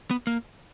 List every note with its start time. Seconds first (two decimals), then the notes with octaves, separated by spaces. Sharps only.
0.11 B3
0.27 A#3